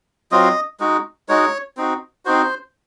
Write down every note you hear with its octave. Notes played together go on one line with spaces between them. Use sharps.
F#3 C4 F4 D#5
G#3 D#4 F#4
G#3 D#4 F#4 C#5
C4 D#4 F#4
C4 D#4 F#4 C5